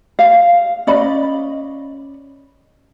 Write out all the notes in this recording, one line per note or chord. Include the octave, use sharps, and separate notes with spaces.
F5
C#4 D5 D#5 B5